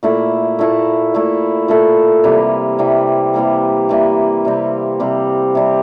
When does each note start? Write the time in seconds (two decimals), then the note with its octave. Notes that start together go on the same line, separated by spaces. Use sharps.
0.03 A#2 A3 E4 A4
0.59 A#2 A3 E4 A4
1.14 A#2 A3 E4 A4
1.68 A#2 A3 E4 A4
2.24 C3 E3 G3 A#3
2.79 C3 E3 G3 A#3
3.34 C3 E3 G3 A#3
3.89 C3 E3 G3 A#3
4.45 C3 G3 C4
5.00 C3 G3 C4
5.55 C3 G3 C4